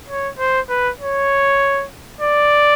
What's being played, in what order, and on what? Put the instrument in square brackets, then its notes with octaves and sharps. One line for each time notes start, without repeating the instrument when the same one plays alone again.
[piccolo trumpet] C#5
C5
B4
C#5
D5